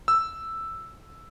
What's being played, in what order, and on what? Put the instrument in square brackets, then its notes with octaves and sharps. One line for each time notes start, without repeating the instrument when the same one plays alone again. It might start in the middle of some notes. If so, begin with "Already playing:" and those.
[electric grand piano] E6